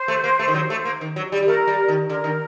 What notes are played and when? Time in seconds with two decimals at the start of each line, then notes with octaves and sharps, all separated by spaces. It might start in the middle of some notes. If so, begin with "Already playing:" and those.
Already playing: C5
0.08 A3
0.24 A#3
0.39 A3
0.48 D#3
0.54 F#3
0.70 A3
0.85 A#3
1.01 D#3
1.16 F#3
1.32 G3
1.43 G3
1.47 A3 A#4
1.67 G3
1.88 D#3
2.09 D3 A#4
2.24 D#3